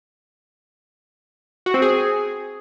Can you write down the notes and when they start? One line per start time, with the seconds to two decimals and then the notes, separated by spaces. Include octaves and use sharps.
1.66 F#4
1.74 C4
1.82 G#4